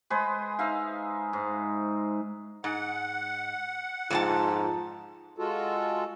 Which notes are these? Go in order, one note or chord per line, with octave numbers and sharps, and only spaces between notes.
G#3 G#4 B4 C5
D#4 E5 F5
G#2
G#2 F#5
F2 G#2 D4 F4 A5
G#3 F4 F#4 A4